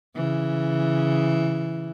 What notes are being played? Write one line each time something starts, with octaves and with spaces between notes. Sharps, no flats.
C#3 E3